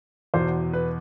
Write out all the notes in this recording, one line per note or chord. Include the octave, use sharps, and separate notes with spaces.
E2 B2 C5
B4